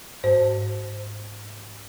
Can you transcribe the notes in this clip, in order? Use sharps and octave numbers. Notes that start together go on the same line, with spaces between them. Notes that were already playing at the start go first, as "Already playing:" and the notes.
G#2 C5